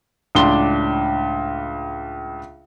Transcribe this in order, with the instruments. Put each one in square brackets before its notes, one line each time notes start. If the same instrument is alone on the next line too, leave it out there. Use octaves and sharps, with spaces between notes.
[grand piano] C#2 A2 D4 C6 D6 G7